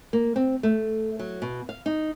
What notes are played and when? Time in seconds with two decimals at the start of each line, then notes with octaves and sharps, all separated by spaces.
0.13 A#3
0.36 C4
0.63 A3
1.19 F#3
1.42 B2
1.69 F5
1.86 D#4